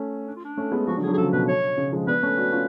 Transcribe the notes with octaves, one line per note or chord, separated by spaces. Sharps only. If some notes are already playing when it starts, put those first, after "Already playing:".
Already playing: A3 C#4
D4
F4
D4
A3 C#4
G#3 B3
F3 G#3 F#4
D3 F#3
G#4
D3 F#3
G#4
C#3 F3 A4
B2 B4
C#5
C#3
F3 G#3
B3 D4 B4
A3 C#4
D4 F#4
C#4 F4